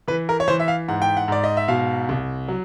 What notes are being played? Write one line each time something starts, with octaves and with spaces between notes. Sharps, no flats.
E3 B4
A#4
C#5
E3 C5
E5
F5
G#2 F#5
G5
F#5
G#2 D5
D#5
E5
B2 F5
C2
F#3